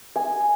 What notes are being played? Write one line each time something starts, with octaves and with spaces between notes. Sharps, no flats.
G#5